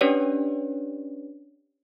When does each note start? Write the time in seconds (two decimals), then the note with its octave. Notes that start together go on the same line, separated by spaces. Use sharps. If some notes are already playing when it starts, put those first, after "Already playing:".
0.01 C#4 D4 G4 B4 C#5 D5